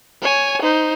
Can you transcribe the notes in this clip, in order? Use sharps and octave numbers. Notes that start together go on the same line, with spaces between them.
C#5 G#5
D#4 C5